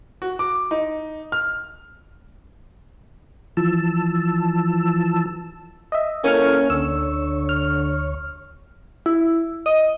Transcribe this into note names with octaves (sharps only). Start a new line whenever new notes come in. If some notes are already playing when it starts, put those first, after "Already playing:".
F#4
D6
D#4
F6
E3 F3 A5 E6
D#5 E5
A#3 C#4 E4 A4 A#4 C#6 F6
D2 D3 C#5 E6
F6
E4
D#5